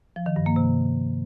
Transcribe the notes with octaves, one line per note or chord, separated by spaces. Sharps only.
F3
D#3
G2
A#3
C3